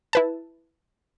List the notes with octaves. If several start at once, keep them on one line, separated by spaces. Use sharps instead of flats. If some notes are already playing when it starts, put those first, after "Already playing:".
E4 B4 A5